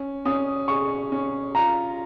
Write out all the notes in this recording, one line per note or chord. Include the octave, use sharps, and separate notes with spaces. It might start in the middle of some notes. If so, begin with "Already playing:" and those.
Already playing: C#4
C#4 D#6
G#4 C#6
C#4
F4 A#5